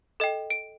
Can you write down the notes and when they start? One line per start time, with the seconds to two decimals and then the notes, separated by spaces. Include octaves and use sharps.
0.20 A4 D#5 G5
0.50 D7